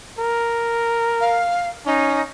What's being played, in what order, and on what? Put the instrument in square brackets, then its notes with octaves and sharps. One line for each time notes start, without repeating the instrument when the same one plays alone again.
[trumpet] A#4
[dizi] F5
[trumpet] C#4 [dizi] D#4